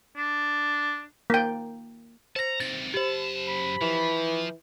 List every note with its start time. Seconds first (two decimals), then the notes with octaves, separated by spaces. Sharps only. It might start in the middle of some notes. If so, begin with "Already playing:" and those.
0.16 D4
1.30 A#3 G5
2.36 C5 A5 A#5 A#6
2.60 C3 D#3 A6
2.94 F#2 G4 C5 A5
3.48 B5
3.81 E3 F3